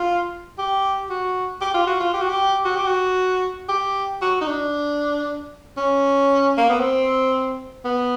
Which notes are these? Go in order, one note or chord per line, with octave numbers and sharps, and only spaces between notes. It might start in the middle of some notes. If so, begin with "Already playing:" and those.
Already playing: F4
G4
F#4
G4
F4
F#4
F4
G4
F#4
G4
F#4
G4
F#4
G4
F#4
D#4
D4
C#4
A#3
B3
C4
B3